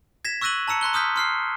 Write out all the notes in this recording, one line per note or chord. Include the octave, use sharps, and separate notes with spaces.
G#6 A#6 B6 E7
C#6 E6 F#6 A#6 D#7 F#7
A5 A#5 E6 C#7
A#5 C6 F#6 G7
C6 D#6 F6 G6 B6
C6 F6 C7